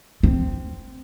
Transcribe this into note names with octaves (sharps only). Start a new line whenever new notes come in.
C4